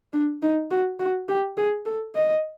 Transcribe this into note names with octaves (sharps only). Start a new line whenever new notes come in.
D4
D#4
F#4
F#4
G4
G#4
A4
D#5